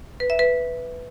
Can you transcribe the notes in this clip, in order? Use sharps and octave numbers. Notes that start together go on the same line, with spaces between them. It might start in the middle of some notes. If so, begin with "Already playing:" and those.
B4
E5
B4